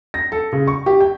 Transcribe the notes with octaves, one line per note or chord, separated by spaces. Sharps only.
A#6
A4
C#3
C#6
G4
G5